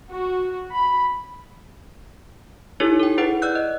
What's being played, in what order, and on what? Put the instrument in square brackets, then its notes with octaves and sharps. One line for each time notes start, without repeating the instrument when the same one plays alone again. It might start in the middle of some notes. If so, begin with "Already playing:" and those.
[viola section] F#4
B5
[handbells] D#4 E4 G4 A4 C#5
A4 G5
E4 G#4 B4 F#5
D5 E6 F#6 G6
D#5